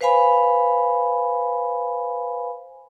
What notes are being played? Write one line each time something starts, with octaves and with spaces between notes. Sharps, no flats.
B4 C5 F5 G#5 B5